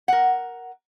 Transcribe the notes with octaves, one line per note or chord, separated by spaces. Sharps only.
A#4 F#5